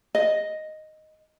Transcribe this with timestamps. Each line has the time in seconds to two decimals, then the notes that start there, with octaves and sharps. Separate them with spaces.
0.15 D#5